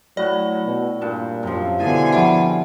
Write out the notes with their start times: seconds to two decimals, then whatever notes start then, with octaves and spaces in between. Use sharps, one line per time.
0.17 A2 F#3 E4 F#4 D5
0.66 B2
1.01 G2 A#2 A5
1.43 F#2 C3 F3
1.80 B2 D3 E4 G#4 G#5 A5
2.12 F3 G3 E5 F#5